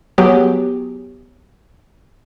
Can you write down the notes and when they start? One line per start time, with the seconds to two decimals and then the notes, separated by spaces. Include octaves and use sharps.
0.18 F#3 B3 G4 G#4